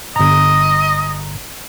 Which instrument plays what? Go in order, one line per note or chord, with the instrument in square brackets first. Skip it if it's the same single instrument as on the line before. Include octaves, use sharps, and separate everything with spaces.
[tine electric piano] G1 A#5 [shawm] D#5